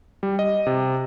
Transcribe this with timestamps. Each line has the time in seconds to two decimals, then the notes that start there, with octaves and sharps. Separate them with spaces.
0.23 G3
0.39 D#5
0.67 C3